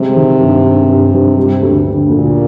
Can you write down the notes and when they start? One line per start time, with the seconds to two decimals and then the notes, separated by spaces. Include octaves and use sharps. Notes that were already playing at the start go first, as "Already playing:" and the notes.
Already playing: C3 G#3
0.16 D#3
0.40 G2
0.64 G2
0.89 G2
1.13 G2
1.37 G3
1.61 D2
1.86 D3
2.10 D2 A#2